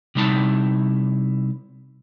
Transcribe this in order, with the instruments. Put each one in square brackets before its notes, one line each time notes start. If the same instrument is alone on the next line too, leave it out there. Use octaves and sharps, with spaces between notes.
[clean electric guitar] C3 G3 D#4 E4 A5